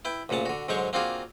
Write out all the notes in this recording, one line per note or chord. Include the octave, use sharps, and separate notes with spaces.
E4 B4 G5
D2 A#2 C#3 F#5 A5
D3 F#4
G#2 D3 F#3 G#3 C5 C#6
A#3 C4 D4 F4 F#4 G#4